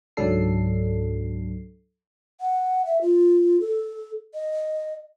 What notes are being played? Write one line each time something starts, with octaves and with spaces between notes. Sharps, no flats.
C#2 G#2 F#3 D4 A4 C7
F#5
E5
F4
A4
D#5